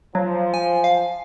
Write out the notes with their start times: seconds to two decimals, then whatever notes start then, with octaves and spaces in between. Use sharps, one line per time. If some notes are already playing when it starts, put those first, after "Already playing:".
0.15 F3 F#3
0.54 G#5
0.84 F5